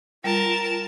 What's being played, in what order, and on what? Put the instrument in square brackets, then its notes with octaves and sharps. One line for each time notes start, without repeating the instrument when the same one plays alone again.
[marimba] G3 [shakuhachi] F4 [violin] A#4 A5